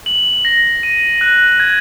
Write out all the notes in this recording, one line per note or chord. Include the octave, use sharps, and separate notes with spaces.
F#7
A#6
D#7
F#6
G#6